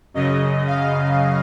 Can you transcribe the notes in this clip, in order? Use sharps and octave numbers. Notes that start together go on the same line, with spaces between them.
F#2 C#3 D#5
F5